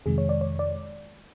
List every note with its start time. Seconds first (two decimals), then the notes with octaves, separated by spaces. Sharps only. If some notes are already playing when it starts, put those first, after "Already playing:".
0.06 F2 C3 D#3 G#3 G#4
0.18 C#5
0.29 D5
0.41 C#5
0.59 D5